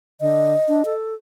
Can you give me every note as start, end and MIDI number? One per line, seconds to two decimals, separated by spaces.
0.21 0.54 50
0.21 0.93 75
0.68 0.83 62
0.85 1.14 69